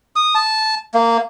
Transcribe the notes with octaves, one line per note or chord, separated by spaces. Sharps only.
D#6
A5
A#3